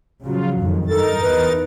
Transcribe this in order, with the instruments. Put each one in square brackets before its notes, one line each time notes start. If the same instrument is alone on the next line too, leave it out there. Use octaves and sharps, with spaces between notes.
[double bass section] C#3 F3 F#3 [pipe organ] F4
[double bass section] F2 D#3 [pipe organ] G#2
[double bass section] G2 [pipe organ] D#4 A#4 A6 [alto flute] A4
[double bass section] E2 [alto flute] B4